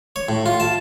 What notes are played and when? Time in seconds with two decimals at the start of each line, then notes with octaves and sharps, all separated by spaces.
0.16 C#5
0.29 A2
0.46 F4
0.60 A5